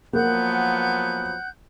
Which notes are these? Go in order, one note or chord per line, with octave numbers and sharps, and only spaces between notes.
F3 F#3 A#3 B3 F#5 F#6 G6